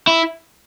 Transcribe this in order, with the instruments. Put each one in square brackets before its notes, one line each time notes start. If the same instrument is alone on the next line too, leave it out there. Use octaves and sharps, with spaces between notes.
[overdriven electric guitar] E4